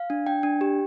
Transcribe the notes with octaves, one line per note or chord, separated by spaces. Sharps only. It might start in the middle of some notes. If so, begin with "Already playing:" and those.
Already playing: F5
D4
D4 G5
D4
G4